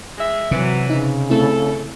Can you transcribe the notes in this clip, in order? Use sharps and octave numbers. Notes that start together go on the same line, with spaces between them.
G#3 E5
C3 E3 F#3
C#3 D#4
A3 C4 E4 A4